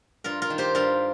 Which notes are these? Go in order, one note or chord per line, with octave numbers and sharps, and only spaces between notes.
G2 F4 A#4
F4 A#4
D#3
G4 C5
G2 F4 A#4